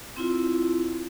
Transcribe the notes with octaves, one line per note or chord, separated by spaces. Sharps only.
C4 E4 F4